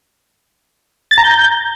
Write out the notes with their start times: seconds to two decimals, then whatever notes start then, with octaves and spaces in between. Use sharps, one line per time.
1.11 A6
1.18 A#5
1.24 G6